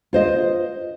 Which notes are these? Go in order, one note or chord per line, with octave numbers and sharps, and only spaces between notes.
F4 C5 D#5